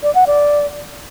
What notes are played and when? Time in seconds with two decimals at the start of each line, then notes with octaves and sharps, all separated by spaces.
0.03 D5
0.15 F#5
0.27 D5